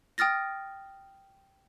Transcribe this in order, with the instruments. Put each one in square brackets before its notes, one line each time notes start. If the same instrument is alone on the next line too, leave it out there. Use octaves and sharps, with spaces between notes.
[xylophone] G5 D#6 F6 A6 A#6